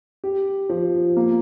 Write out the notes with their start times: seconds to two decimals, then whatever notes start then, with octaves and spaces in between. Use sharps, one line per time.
0.24 G4
0.69 F3
1.17 A#3